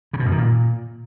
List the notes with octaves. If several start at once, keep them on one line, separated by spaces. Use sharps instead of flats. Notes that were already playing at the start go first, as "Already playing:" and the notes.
C#3
B2
F#2
D#3
A#2